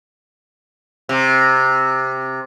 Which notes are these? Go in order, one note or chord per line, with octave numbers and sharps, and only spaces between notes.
C3